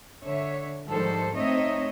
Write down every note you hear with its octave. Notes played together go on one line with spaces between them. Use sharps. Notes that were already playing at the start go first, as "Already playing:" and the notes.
D3 C#5 E5
G#2 D#3 F3 G3 A4 C5
A3 C4 D#4 C#5 D#5 E5